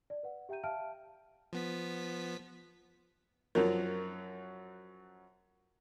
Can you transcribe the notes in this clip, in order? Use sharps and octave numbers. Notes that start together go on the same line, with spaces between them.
D5
B4 F#5
G4 E5 G5 A#5 G6 D#7
E5 F5 G5 A5 F6 D7
F3 B3 B6
F#2 F3 F#3 A#4